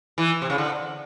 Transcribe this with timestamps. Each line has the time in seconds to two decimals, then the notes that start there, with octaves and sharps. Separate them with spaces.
0.18 E3
0.42 C3
0.50 C#3
0.58 D3